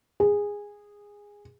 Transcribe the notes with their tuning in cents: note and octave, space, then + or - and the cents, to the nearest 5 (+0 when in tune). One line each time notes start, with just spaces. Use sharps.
G#4 -15